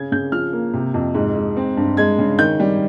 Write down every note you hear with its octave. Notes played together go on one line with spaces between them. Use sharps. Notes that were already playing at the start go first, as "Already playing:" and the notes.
Already playing: C#3 G#6
C#3 G6
F3 F6
A#3
C3
F2
G#2
G#2
C4
G2
G#3 G#6
C#3
D#3 G6
G3